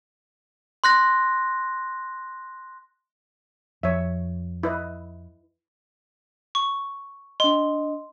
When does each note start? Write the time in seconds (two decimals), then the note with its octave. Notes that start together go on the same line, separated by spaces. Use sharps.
0.84 C6 F#6 A#6
3.83 F2 C#5 E5
4.63 E4 B4 D#5
6.55 C#6
7.40 D4 D#5 C6